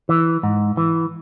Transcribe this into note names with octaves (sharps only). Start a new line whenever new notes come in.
E3
G#2
E3